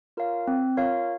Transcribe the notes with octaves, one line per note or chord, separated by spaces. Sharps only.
F4 A#4 C#5 F5
C4
F4 A#4 C#5 F5